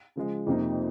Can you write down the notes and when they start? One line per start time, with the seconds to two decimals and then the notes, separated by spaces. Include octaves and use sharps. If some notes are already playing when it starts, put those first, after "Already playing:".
0.16 C#3 F3 G#3
0.47 F2 C3 F3 A#3 D#4